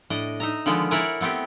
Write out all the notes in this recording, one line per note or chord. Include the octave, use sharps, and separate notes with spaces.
A2 D4 D#5
D#4 E5 A#5
D3 D#3 F3 G#3 B3
E4 A#4 C#5 D5 F#5 G#5
A3 B3 C4 G4